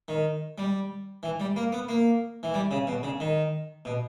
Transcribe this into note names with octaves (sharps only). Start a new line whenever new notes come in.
D#3
G3
E3
G3
A#3
B3
A#3
E3
G3
C#3
B2
C#3
D#3
B2